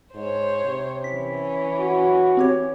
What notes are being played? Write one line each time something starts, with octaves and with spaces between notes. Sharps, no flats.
G#2 C5 C#5
C3
E3 C#4 B6
F#4
C4 G4 C#5